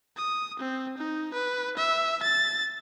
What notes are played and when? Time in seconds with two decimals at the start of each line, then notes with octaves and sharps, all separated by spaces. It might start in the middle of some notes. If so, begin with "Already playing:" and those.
0.17 D#6
0.59 C4
0.98 D#4
1.33 B4
1.77 E5
2.23 A6